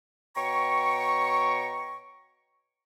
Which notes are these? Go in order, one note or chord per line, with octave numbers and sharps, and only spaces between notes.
B2 C#5 G5 A#5 C#6